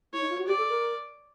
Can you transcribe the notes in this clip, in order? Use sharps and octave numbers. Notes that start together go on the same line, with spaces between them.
E4 C#5
D#4
F4
F#4
G4 D5
A4
A#4